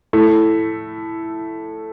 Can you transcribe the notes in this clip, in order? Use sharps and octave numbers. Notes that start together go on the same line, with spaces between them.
A2 A3